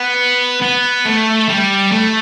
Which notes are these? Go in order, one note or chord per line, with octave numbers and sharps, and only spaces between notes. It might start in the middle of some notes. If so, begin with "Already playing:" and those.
Already playing: B3
B3
A3
G3
A3